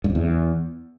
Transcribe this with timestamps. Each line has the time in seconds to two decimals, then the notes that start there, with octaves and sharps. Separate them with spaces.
0.04 G2
0.10 F2
0.15 E2